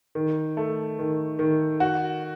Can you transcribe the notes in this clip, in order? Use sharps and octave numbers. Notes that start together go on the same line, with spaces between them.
D#3
A3
D#3
D#3
F#4